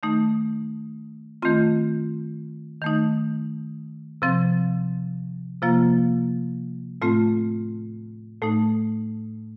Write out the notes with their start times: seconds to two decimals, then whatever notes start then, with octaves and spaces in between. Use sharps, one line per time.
0.03 D#3 A3 D#4
1.42 D#3 A3 C4 F4
2.82 D#3 A3 D#4
4.22 C3 F3 C4
5.62 C3 F3 A#3 F4
7.02 A2 A3 C4 F4
8.42 A2 A3 D#4